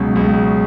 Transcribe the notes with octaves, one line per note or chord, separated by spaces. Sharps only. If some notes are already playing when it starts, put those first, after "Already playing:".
Already playing: C#2 B2 F#3 C#4
C#2